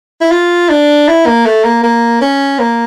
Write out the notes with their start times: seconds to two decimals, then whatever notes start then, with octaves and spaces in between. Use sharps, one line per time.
0.21 E4
0.31 F4
0.69 D4
1.08 E4
1.26 A#3
1.45 A3
1.64 A#3
1.83 A#3
2.21 C#4
2.59 A#3